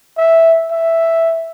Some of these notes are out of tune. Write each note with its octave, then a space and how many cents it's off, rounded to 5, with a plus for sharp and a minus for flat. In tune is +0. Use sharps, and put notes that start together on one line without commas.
E5 -5
E5 +0